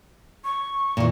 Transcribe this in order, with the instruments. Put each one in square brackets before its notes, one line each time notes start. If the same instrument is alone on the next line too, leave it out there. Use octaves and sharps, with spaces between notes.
[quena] C#6
[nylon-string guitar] A#2 E3